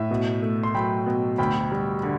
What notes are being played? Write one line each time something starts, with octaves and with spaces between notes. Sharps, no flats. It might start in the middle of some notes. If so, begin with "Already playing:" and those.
Already playing: A2 E5
B2
A3
C6
F#3 G5 B5
B2
D2 G5 B5
G3
D3